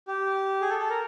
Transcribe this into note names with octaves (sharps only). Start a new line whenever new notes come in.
G4
G#4
A4
A4
A#4